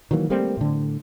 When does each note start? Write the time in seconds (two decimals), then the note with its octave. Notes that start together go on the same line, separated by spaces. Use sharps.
0.11 D#3 E3 F#3 A#3
0.30 G3 A3 A#3 C4
0.57 A2 D3